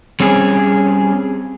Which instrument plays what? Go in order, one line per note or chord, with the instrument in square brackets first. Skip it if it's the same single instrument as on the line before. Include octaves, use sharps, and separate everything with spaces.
[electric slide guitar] G3 C4 C#4 G#4